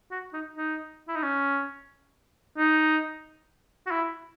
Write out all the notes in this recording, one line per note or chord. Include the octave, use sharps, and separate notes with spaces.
F#4
D#4
D#4
E4
D#4
C#4
D#4
F#4
E4